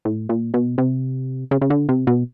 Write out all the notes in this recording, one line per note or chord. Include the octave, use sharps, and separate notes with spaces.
A2
A#2
B2
C3
C#3
C#3
D3
C3
B2